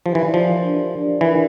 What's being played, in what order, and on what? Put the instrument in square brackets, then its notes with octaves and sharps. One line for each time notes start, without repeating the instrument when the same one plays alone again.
[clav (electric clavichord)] F3 [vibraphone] G4
[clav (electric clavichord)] E3
[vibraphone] D5
[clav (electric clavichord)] F3
[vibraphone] A#4
D4
G4
D5
[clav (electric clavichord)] E3 [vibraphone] A#4